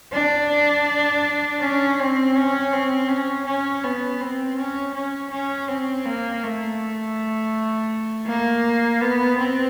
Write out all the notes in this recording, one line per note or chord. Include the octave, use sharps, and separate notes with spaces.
D4
C#4
C4
C#4
C4
C#4
C#4
B3
C4
C#4
C#4
C#4
C4
A#3
A3
A#3
B3
C4